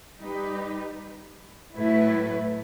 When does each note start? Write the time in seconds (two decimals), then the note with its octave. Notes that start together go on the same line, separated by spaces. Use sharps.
0.19 G3 D#4 G4 B4
1.75 A2 F#3 A3 E4 B4